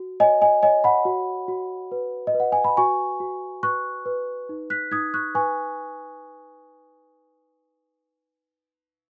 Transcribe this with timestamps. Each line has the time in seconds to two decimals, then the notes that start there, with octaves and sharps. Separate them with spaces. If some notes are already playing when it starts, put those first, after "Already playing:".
Already playing: F#4
0.20 C#5 D#5 G#5
0.42 D#5 G#5
0.63 C#5 D#5 G#5
0.84 F#5 B5
1.05 F#4
1.48 F#4
1.92 B4
2.27 D#5
2.34 B4
2.40 F#5
2.52 G#5
2.64 B5
2.77 F#4 G#5 C#6
3.20 F#4
3.63 B4 C#6 F#6
4.06 B4
4.49 D#4
4.70 F#6 B6
4.92 D#4 D#6 G#6
5.14 C#6 F#6
5.35 B4 G#5 C#6